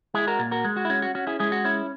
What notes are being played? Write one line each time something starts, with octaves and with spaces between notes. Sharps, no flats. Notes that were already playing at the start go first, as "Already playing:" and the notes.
G#3 E4 G#4
F#4 A#4
A#2
F#4 A#4
G#3
F#4
E4
C#4 F#4
F#4
C#4 F#4
E4 G#4
G#3 E4 G#4
F#4
C#4 E4